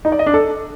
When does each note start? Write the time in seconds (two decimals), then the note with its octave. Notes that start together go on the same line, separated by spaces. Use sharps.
0.05 D#4
0.12 D5
0.19 D#5
0.26 D4
0.34 A4